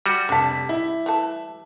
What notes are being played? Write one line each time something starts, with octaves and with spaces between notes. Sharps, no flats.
G3 F#4
F1 D4 A5 B6
E4
E3 A3 A5